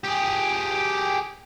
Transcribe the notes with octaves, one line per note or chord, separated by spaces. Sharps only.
G4 G#4